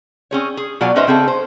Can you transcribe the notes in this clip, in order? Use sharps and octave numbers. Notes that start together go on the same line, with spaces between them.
C4 C#4 G#4 C#5
G#4
B2 F#3 F4 D5 G#5
C#4 D#4 B4 C5 D#5 E5
C#3 C4 G#4 A4
C5